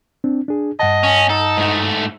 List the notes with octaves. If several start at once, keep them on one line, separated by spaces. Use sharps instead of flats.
C4 D4
D4 G#4
G2 D#5 F#5 A5
C#4
D#4 A4
G#2 A3